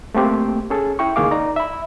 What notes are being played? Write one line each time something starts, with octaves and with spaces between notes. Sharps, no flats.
A3 A#3 C4 G4
C#4 G#4 A4
E4 G5 C#6
C#2 D#3 A#3 G#4 F5 D6
D#4 D5 A#5
E5 B5